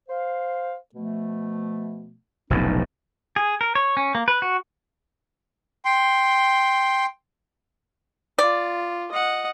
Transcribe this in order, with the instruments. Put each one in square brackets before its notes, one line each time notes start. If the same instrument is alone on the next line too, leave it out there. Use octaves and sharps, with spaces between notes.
[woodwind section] C5 F5
B2 F3 A3
[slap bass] F1 B1 A2 [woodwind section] C3 C#4 D#4
[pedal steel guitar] G#4
A#4
C#5
C#4
A#3
B4
F#4
[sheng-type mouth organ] G5 C6
[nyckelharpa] F4 [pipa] D5
[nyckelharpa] D#5 F#5